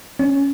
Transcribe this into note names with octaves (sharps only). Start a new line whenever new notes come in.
C#4